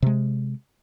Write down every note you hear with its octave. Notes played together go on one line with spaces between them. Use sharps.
C3 G#3